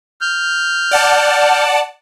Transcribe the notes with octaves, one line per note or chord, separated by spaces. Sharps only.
F6 G6
D5 F#5 A5